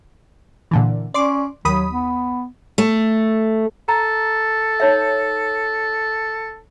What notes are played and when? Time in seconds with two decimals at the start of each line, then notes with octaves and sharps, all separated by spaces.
0.71 A#2 D3 E3
1.14 C#4 D5 C6 D6
1.65 D#2 F#3 B5 D#6
1.92 B3
2.78 A3
3.88 A4 A#5
4.80 D#4 C#5 E5